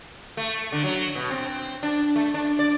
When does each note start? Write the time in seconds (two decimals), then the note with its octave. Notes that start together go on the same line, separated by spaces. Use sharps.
0.37 A3
0.72 D3
0.84 F#3
1.16 B2
1.31 C4
1.83 D4
2.16 A3
2.34 D4
2.59 D5